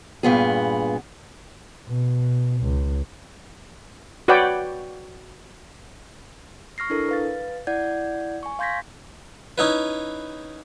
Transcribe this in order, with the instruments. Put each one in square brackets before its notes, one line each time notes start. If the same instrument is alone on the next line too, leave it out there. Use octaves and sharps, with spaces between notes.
[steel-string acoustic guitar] G2 A#2 B3 G#4
[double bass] B2
C#2
[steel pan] F#4 B4 C#5 D5 F#5 G5
[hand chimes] C#6 F6 A#6 C7
D4 E4 A4 A#4
B4 F5 A6
E4 D5 F#5 G6 G#6
G#5 C#6
F5 C6 G6 G#6 A#6 B6
[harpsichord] C#4 D#4 E4 B4